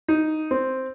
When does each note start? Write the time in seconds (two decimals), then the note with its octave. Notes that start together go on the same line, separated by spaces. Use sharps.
0.08 D#4
0.51 C4